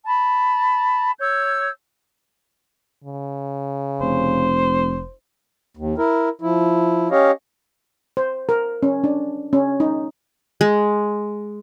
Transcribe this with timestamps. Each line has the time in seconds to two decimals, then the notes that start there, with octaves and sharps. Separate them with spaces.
0.05 A5 B5
1.18 C#5 E6 G6 G#6
3.04 C#3
4.01 F1 C5
5.77 D#2
5.98 E4 A#4
6.42 F3 E4
7.11 C#4 G4 C#5 D#5 F5
8.17 C5
8.49 A#4
8.83 C#4
9.04 D4
9.53 C#4
9.80 D#4
10.61 G#3